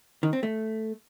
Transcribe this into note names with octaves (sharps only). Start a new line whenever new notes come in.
D#3
C4
A3